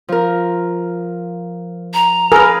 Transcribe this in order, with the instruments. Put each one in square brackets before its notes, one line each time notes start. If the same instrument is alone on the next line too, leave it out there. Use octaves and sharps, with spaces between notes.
[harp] F3 A#4
[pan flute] A#5
[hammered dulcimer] G#4 B4 [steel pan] A#4